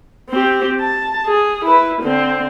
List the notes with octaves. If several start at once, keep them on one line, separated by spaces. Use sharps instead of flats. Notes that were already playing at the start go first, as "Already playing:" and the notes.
C4 G4
A5
G#4
E4 B4
D3 C4